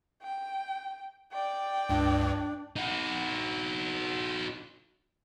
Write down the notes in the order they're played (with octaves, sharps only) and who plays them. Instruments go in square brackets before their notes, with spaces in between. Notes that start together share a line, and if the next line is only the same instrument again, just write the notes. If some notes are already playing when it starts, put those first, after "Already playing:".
[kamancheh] G5
D5 G5
[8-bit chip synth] C#2 G2 [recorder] D4
[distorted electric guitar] D#4 F#4